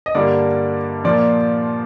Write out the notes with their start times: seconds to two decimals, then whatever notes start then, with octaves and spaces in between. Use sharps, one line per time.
0.06 D#5
0.15 G2 D3 G3 A#3 D5
1.04 A#2 F3 A#3 D5